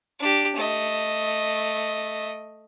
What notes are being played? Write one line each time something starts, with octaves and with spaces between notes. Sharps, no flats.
D4 G4
A3 D#5